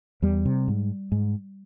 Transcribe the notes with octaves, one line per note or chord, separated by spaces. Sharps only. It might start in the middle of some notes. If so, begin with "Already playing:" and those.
E2 G3
C3
G#2
G#2